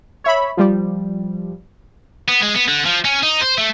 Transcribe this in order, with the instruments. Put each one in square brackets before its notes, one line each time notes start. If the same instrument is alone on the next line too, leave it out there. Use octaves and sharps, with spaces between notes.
[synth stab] C#5 E5 B5
F3 G3
[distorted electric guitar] B3
G#3
B3
D3
F3
C#4
D#4
C5
A3